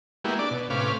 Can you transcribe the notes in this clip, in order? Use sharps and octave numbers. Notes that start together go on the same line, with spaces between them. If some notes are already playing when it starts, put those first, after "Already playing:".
G#3 A#3 B3 E4 F#4 G4
D4 D5
B2
A2 C3 C#4 B4 F5 D6